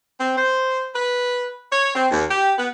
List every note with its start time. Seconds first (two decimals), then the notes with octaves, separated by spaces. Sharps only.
0.20 C4
0.38 C5
0.94 B4
1.71 C#5
1.94 C4
2.11 D#2
2.30 G4
2.57 B3